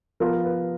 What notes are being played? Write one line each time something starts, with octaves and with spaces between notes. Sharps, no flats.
F3 B3 F4 A#4
B4